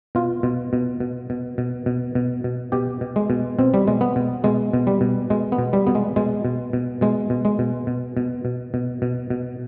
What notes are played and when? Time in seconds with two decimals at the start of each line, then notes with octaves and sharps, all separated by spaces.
0.15 B2 F4
0.43 B2
0.73 B2
1.00 B2
1.30 B2
1.58 B2
1.86 B2
2.15 B2
2.44 B2
2.72 B2 G4
3.01 B2
3.16 G#3
3.30 B2
3.59 B2 C4
3.74 G3
3.87 B2 G#3
4.01 B3
4.16 B2
4.44 B2 G#3
4.73 B2
4.87 G3
5.01 B2
5.30 B2 G#3
5.52 B3
5.59 B2
5.73 G3
5.87 B2 B3
5.95 G#3
6.16 B2 G#3
6.45 B2
6.73 B2
7.01 B2 G#3
7.30 B2
7.45 G#3
7.59 B2
7.87 B2
8.17 B2
8.45 B2
8.74 B2
9.02 B2
9.30 B2